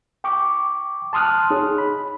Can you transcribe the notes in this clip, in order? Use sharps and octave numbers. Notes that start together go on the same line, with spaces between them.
G5 C#6 D6
A5 C6 D#6 F6 F#6
D#4 G#4 C#5
B5